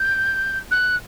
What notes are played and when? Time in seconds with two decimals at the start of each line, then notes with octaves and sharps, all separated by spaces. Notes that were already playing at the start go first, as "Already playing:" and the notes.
Already playing: G6
0.71 F#6